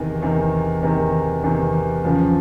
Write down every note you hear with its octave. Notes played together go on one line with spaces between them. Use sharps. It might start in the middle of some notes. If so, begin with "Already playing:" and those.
Already playing: E2 C3 D#3
E2 C3 D#3
E2 C3 D#3
E2 C3 D#3
E2 C#3 F3